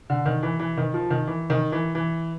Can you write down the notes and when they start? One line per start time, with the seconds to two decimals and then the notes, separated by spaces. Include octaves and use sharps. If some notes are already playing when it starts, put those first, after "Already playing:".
0.10 D3
0.26 D#3
0.43 E3
0.60 E3
0.77 D#3
0.94 F3
1.10 D#3
1.27 E3
1.50 D#3
1.72 E3
1.95 E3